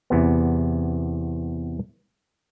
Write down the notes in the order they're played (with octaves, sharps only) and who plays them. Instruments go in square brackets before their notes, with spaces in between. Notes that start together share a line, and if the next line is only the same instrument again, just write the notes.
[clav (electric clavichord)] E2 C3 B3